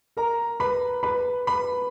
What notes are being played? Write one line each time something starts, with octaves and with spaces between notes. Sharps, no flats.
A#4 A#5
B4 B5
B4 B5
B4 B5